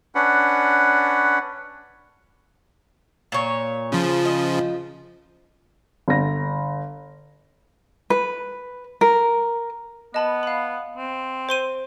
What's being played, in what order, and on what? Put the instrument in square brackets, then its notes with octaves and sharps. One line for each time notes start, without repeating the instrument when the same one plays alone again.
[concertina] C#4 D4 B4 F#5
[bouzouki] A#2 C#5
[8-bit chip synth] C#3 F3 [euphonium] F4
[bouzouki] D#5
[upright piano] G1 A#6
[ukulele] B4
A#4
[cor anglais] B3 [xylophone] D#5 A5 B5
[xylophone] F5 B5
[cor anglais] C4
[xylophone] C5 C6 D#7